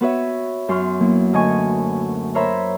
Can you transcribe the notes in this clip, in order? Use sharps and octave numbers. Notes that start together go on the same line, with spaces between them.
B3 F#4 B4 C#5 E5
F#2 C6 C#6 F6
F#3 A#3 B3 E4
D2 D#5 G#5 C#6
A#4 C5 C#5 E5 A#5 B5